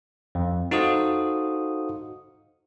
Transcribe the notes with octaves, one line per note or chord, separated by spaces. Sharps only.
F2
D#4 F#4 A4 C5 F5 D#6